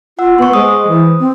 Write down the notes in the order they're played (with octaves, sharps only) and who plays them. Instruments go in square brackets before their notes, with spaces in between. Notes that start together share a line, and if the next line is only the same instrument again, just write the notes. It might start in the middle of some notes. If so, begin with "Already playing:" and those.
[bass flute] F4 [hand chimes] F#5 E6
[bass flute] B3 [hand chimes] C6 C#6
[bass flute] G#3 [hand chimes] C5 D#6
[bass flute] E3
C4